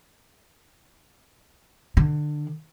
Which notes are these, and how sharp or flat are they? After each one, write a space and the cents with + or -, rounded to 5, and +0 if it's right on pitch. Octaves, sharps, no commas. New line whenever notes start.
D3 +25